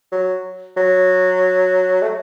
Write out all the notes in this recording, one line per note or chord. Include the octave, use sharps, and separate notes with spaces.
F#3
F#3
A3